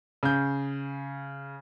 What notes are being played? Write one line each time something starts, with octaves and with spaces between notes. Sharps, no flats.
C#3 G6